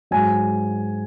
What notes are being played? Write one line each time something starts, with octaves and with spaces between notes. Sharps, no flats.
G#2 F#3 G#5